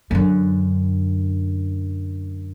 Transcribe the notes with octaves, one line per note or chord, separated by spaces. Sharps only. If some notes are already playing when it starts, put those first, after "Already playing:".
F#2 D3